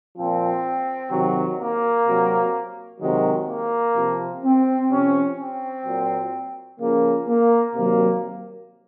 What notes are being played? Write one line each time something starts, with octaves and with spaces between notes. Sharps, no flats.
A#2 F3 C4
C3 D#3 F#3
A#3
C3 F#3
C3 D#3 F#3 G#3
A#3
C3 F3
C4
C3 F3 C#4
C4
A#2 F#3
C#3 F3 A#3
A#3
C3 D#3 F#3 A#3